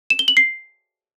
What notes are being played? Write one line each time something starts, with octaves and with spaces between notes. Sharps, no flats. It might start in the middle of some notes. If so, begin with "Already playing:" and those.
E7
G7
F#7
C7